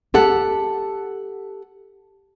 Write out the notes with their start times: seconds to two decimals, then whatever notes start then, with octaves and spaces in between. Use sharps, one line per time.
0.14 G4 A4 F#5